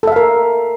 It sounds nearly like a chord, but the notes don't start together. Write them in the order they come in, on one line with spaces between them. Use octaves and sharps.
A4 E5 F5 A#4